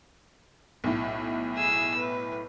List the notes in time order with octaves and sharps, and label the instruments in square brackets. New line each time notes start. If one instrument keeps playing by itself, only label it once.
[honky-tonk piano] B1 A2
[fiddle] G#4 E6
B4